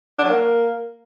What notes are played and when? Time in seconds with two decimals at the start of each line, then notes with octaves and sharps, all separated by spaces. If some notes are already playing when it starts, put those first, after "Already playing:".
0.19 D4
0.24 F#3
0.29 A#3